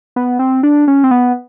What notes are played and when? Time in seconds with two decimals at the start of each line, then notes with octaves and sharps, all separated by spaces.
0.16 B3
0.39 C4
0.63 D4
0.88 C#4
1.04 C4
1.11 B3